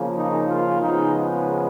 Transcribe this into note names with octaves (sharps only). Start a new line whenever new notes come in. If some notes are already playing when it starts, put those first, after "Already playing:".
Already playing: C#3 F3 A#3
D#4
F4
C#3 F3 G#3 B3 D#4